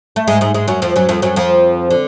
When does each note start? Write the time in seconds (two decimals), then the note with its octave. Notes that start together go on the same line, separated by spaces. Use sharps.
0.16 A3
0.27 G#2 G#3
0.41 G#2 G#3
0.54 G#2 G#3
0.68 F#2 F#3
0.82 F2 F3
0.96 F#2 F#3
1.09 F2 F3
1.22 F#2 F#3
1.36 F2 F3
1.91 D3